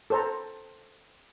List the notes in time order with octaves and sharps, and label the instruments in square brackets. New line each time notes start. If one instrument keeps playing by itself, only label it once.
[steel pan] A4 B4 C5 A5 A#5